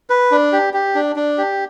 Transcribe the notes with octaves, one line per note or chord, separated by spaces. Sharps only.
B4
D4
G4
G4
D4
D4
G4